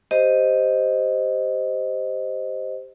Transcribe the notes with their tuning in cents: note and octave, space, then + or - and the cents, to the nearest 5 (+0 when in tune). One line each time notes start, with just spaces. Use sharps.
G4 +0 C5 +0 D#5 +0